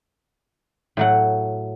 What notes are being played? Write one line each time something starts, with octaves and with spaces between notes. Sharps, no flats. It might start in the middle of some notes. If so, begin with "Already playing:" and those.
A2 F#3 F#5